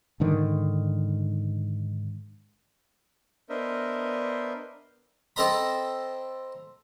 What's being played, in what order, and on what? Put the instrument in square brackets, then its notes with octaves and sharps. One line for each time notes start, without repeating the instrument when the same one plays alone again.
[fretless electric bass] G#2 D3 D#3
[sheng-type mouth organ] B3 D4 A#4 C5 D#5 E5
[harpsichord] C4 A4 C5 D#5 A#5 B5